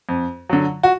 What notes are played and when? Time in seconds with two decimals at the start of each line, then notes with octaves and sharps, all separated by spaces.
0.09 F2
0.50 D3 F#3
0.83 F#4